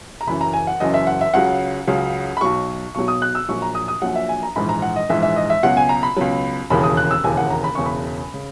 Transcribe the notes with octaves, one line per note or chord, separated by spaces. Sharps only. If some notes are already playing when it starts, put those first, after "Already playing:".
A#5
F#1 F#2 E3 B5
A#5
G#5
F#5
F#1 F#2 E3 D#5
E5
F#5
E5
C#2 C#3 F#3 F#5
C#2 C#3 F#3
B5
B1 B2 F#3 C#6
B1 B2 F#3 C#6
D#6
F#6
E6
A#1 A#2 F#3 C#6
A#5
D#6
D#6
A#1 A#2 F#3 F#5
E5
G#5
A#5
A#1 G#2 E3 B5
A#5
F#5
D#5
A#1 G#2 E3 E5
E5
D#5
E5
C#2 B2 F#3 F#5
G#5
A#5
B5
C#2 B2 F#3
E1 D#2 C#3 E3 B5
D#6
F#6
E6
E1 D#2 C#3 E3 G#5
F#5
A#5
B5
E1 E2 C#3 C#6
B5
C#3